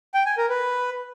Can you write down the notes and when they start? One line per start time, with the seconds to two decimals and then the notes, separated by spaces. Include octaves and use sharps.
0.14 G5
0.26 G#5
0.38 A#4
0.49 B4